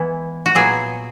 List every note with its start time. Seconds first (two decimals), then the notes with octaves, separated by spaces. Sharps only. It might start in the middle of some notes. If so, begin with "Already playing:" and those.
Already playing: E3 G#3 B3 E4
0.46 F#4
0.55 A#2 F#3 B3 E4 G#4